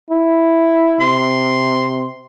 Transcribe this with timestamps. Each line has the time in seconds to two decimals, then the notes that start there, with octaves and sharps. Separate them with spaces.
0.11 E4
1.01 C3 C6